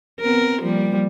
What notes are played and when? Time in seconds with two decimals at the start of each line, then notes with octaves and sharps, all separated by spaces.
0.21 B3 C4 A#4
0.62 F3 G3 A#3